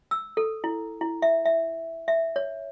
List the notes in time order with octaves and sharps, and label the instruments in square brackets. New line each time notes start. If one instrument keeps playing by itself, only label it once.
[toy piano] E6
A4
E4
E4
E5
E5
E5
C#5